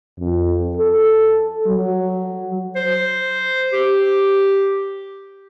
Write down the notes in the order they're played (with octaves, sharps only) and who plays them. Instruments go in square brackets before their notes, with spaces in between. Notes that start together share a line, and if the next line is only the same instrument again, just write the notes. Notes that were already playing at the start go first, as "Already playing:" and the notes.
[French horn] F2
A4
F#3
[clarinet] C5
G4